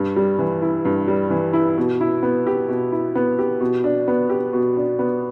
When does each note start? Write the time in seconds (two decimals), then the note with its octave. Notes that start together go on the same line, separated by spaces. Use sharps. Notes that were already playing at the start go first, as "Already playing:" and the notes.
Already playing: G2
0.16 G3
0.38 E3
0.62 E4
0.85 G2
1.08 G3
1.30 E3
1.53 E4
1.78 B2
2.01 E4
2.23 B3
2.47 G4
2.69 B2
2.92 E4
3.15 B3
3.39 G4
3.61 B2
3.84 D4
4.08 B3
4.30 G4
4.53 B2
4.77 D4
4.99 B3